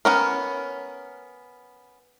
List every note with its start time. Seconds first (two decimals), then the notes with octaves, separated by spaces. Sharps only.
0.05 B3 C#4 A#4